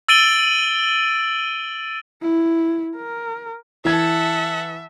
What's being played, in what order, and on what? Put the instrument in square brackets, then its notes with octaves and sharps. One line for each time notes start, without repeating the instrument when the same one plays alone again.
[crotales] E6 A6 D7 D#7 F#7 G7
[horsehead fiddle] E4
A#4
[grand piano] E3 G#6 [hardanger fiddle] A4 F#5 [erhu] E5